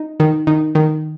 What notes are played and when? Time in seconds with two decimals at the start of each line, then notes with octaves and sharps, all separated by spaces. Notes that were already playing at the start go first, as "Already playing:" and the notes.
Already playing: D#4
0.20 D#3
0.47 D#3
0.75 D#3